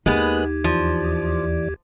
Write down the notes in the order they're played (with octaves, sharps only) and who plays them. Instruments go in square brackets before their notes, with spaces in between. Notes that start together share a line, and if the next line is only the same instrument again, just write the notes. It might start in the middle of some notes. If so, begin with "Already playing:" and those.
[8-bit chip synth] D#2 G4 G#6 [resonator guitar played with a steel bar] G#3 B3 [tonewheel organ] A#3 F#6 [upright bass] D#4
[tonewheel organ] E2 E3 D5 [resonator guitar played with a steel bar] F3